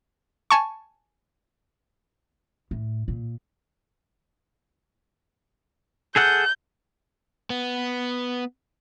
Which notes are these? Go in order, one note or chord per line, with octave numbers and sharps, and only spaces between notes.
G#5 A5 C#6
A2
A#2
G#4 A4 F#5 G6
B3